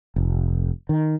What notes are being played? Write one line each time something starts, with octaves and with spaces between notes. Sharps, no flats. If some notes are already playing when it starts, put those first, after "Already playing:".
F1
D#3